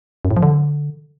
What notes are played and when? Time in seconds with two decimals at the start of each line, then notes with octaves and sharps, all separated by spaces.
0.25 F#2
0.31 A2
0.37 F3
0.43 D3